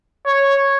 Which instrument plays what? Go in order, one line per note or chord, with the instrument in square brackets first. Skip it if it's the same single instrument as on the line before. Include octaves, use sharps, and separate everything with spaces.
[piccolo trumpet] C#5